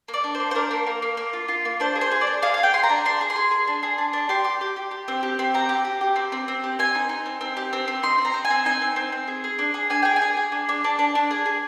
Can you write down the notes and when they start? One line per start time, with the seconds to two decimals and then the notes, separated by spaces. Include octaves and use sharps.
0.08 A#3
0.14 D5
0.24 D4
0.35 C5
0.40 A#3
0.51 C5
0.55 D4 A#4
0.71 A#3
0.87 A#3
1.02 A#3
1.17 A#3
1.33 F4
1.48 F4
1.65 A#3
1.80 D4 C5
1.96 G#4
2.01 C5
2.11 G#4
2.21 D5
2.27 D4
2.42 G#4 F5
2.54 F5
2.58 G#4
2.63 G5
2.73 G#4 C6
2.83 A#5
2.89 D4
3.05 D4 C6
3.21 G#4
3.30 C6
3.36 G#4
3.51 G#4
3.67 D4
3.83 G#4
3.98 D4
4.13 D4
4.29 G4 C6
4.44 G4
4.61 G4
4.76 G4
4.91 G4
5.08 C4
5.23 G4
5.39 C4
5.54 G4 A#5
5.69 G4
5.85 G4
6.01 G4
6.16 C4
6.32 C4
6.48 C4
6.64 G4
6.79 C4 G#5
6.95 D#4
7.09 D#4
7.26 C4
7.41 C4
7.57 G4
7.73 C4
7.88 C4
8.03 D#4 C6
8.18 C4
8.25 A#5
8.34 C4
8.45 G#5
8.50 C4
8.65 D#4 G#5
8.82 C4
8.96 C4
9.12 C4
9.28 G#4
9.44 G#4
9.59 D4
9.74 G#4
9.90 D4 G#5
10.03 G#4 G5
10.16 G#5
10.22 G#4
10.37 G#4
10.52 D4
10.69 D4
10.84 D4
10.99 D4
11.15 D4
11.31 G#4
11.46 G#4